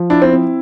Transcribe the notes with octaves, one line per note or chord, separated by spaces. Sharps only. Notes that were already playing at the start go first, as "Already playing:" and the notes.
Already playing: F3
D4 E4
C4
C4